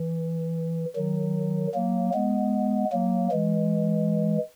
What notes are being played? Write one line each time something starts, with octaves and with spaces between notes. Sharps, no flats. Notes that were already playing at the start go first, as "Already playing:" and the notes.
Already playing: E3
D#3 F#3
F#3 A#3
G#3 B3
F#3 A#3
E3 G#3